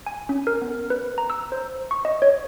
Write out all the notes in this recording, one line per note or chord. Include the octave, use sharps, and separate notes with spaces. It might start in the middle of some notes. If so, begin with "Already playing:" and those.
G#5
C#4
A#4
B3
B4
A#5
E6
C5
C#6
D#5
C#5